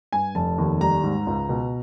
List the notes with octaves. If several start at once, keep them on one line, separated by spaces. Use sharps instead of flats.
G2 G#5
F1 A5
D#2
G3 A#5
G#2
C#2
B2